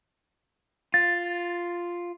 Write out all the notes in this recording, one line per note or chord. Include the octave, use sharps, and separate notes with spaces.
F4 A6